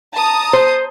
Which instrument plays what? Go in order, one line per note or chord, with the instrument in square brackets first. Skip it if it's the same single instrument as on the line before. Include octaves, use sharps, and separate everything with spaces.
[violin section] A5 A#5 D#6
[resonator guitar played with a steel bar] C5